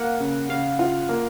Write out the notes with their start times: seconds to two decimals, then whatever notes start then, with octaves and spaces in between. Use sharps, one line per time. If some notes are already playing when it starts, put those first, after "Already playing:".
Already playing: A#3 F5 F#5
0.20 C#3
0.49 C#3 F5
0.79 F4
1.09 A#3